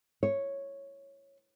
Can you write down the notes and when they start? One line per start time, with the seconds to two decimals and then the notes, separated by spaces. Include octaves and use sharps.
0.23 C#5